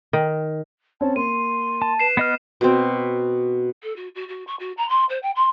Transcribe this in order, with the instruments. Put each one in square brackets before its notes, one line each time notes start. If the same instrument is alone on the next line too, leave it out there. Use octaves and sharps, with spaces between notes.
[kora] D#3
[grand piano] C4 C#4 C#5 [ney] A5
[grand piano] A#3 [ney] C6 [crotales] D#7
[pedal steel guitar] A5
[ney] B4 [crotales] C7 E7
[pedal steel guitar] B3 D#5 F6
[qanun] B2 C4
[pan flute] A4
F#4
F#4
F#4
C#6
F#4
A#5
C6
C5
G5
C6